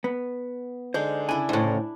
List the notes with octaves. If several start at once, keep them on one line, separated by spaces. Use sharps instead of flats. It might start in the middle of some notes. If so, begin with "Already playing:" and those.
B3
D3 G#3 D#4 C5
C#3 D4 E4 G#5
D2 A2